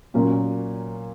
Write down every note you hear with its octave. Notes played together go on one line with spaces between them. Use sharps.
A#2 F#3 A#3 C#4